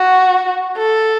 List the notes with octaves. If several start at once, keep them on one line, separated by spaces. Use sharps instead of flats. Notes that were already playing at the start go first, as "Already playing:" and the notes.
Already playing: F#4
A4